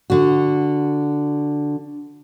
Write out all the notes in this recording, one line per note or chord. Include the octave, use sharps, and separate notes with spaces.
D3 F#4